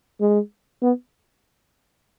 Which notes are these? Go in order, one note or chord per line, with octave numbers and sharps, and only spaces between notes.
G#3
B3